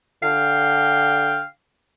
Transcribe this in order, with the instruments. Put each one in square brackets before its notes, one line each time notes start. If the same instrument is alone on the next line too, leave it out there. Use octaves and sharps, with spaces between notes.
[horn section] D3 F5 G5